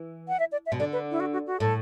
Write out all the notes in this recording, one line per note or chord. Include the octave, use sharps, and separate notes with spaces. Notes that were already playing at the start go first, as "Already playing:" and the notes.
Already playing: E3
F#5
E5
D5
E5
B2
D3 D5
B4
E4
F#4
F#4
F#4
A2 A4